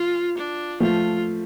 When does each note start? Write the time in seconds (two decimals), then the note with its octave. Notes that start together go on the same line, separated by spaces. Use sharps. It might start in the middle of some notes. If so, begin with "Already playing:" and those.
Already playing: F3 F4
0.38 D4
0.80 F3 A3 F4